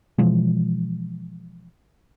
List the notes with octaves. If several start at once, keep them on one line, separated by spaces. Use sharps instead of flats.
B2 E3 F3 G#3